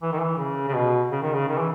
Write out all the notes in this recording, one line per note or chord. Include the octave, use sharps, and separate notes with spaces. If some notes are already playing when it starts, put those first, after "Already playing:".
E3
D#3
E3
C#3
C#3
B2
C#3
D#3
C#3
D#3
E3